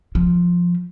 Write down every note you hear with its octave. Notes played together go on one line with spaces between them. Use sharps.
F3